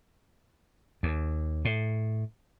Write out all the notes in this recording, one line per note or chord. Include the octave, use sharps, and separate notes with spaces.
D#2
A2